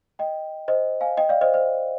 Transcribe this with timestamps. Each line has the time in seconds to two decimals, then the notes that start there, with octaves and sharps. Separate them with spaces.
0.19 D#5 G5
0.68 C5 D#5
1.01 F5 G#5
1.17 D#5 G5
1.29 D5 F5
1.41 C5 D#5
1.54 C5